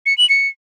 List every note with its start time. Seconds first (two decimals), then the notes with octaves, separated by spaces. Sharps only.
0.06 C#7
0.18 F#7
0.29 C#7